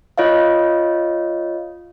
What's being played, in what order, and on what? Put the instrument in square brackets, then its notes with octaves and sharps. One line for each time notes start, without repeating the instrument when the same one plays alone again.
[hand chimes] F4 C#5 D#5 F5